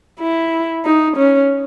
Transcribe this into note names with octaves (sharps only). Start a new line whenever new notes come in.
E4
D#4
C#4